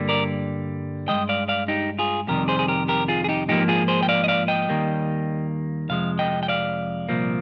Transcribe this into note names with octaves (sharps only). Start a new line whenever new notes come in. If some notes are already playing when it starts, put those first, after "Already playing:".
Already playing: G2 D3 G3 A#3
A#4 D5
F3 G#3 D#5 G5
G2
D5 F5
D5 F5
D#4 G4
F4 G#4
F2 C3 D#3 G3 G4 A#4
G#4 C5
G#4
G4 A#4
G4 A#4
F4 G#4
G#4
D#4 G4
G#2 F3 A#3 D#4 G4
F4 G#4
G#4 C5
G5
D5 F5
D#5
D5 F5
D#5 G5
D#2 D#3 G3 A#3
F2 C3 F3 G#3 F5
D#5 G5
G5
D5 F5
C2 A#2 F3 A#3